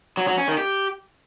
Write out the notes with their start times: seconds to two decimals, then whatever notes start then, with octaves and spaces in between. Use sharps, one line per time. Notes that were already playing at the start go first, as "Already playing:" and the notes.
0.17 F#3
0.28 F#3
0.38 C#4
0.48 D#3
0.58 G4